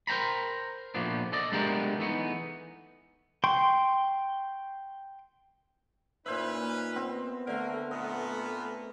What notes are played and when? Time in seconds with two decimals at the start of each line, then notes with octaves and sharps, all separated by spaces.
0.07 A#4 C5 G5 A#5 B5
0.94 A#2 F3 A3 B3 D4
1.32 A4 D5 D#5
1.52 G#3 A3 B3 D4 G4 A#4
1.99 E3 A3 B3 D#4
3.44 G5 C6 C#6
6.26 A#2 C#4 D#4 B4 C5 E5
6.96 B3 C4
7.47 D3 A3 A#3 A4 A#4
7.91 A#2 A3 B3 D#5